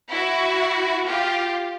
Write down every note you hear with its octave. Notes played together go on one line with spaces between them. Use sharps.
E4 F#4
F4 G4